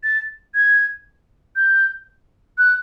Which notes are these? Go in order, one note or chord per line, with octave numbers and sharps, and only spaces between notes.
A6
G#6
G6
F#6